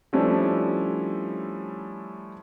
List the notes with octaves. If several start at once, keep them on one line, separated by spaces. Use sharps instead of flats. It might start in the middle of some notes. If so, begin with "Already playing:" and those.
F3 G3 A3 C#4 D4 E4